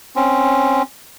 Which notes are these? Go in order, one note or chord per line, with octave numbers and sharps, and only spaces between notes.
C4 C#4